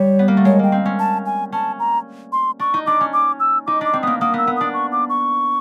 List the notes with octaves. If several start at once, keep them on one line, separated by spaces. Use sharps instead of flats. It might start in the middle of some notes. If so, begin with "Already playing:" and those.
Already playing: G3 C#5
B3
A#3
A3
G#3 C#5
A#3 G5
C4
C#4
A5
G#5
C#4 A5
A#5
C6
D4 C#6
D#4
D4 D6
C#4
D6
E6
D#4 D6
D4 D6
C4
A#3 B3 D#6
A#3 D#6
B3 E6
B3
D4 D#6
C#6
D6
C#6